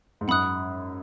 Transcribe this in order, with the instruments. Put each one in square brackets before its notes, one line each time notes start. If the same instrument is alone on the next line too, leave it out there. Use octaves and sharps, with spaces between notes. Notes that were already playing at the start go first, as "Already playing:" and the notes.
[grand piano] G#2
[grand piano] F#2 [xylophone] F#5 B5 D#6 F#6